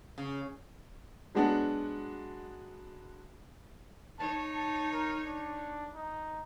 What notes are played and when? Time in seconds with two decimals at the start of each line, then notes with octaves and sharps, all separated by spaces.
0.18 C#3
1.35 F#3 G#3 B3 D4 F#4
4.19 D#4 C#5 A5
4.54 A5
4.93 A#4
5.25 D4
5.95 D#4